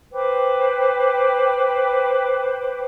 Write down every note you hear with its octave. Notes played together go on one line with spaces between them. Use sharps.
B4 C5 G5 D6